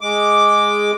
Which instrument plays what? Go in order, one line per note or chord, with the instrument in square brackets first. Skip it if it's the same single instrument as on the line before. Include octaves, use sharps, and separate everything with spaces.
[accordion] G#3 D6